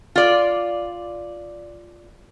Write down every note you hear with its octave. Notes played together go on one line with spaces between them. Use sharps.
F4 D5